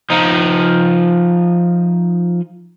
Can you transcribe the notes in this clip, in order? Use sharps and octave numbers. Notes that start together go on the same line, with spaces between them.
F3 D#4